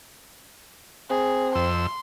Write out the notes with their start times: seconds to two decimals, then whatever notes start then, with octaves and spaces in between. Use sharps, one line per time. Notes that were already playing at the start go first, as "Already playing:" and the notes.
1.10 C4 G#4
1.55 F2 C6 E6